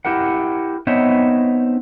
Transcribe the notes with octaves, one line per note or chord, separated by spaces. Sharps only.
E4 G4 A#4 F#5
B3 C4 D#4 C#5 E5